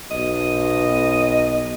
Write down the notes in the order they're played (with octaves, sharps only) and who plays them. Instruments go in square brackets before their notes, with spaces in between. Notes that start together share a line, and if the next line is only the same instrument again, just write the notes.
[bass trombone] B1 [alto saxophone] D#5